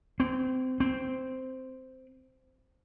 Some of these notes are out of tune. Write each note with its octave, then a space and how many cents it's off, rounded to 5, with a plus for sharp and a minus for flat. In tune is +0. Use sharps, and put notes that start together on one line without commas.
C4 -25
C4 -10